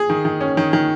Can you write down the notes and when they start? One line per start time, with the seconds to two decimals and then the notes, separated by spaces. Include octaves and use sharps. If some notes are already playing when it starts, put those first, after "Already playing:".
Already playing: G#4
0.10 D#3
0.25 D#3
0.41 C#4
0.57 D#3
0.73 D#3